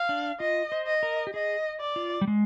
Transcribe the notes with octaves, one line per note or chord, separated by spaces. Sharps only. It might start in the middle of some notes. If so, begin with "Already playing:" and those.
Already playing: F5
D4
F4 D#5
C5
D#5
A#4
G4
G#4 D#5
D5
F4
G3
G#3